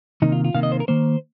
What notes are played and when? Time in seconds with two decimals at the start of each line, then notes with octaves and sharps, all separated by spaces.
0.22 C3 D#3 A#3 D#4
0.32 F4
0.44 F4
0.54 C3 D#3 A#3 F5
0.63 D#5
0.72 C5
0.80 A#4
0.88 D#3 A#3 C5